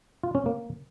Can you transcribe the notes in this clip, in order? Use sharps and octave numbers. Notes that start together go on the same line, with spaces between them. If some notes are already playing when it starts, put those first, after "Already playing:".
F4
C#4
A#3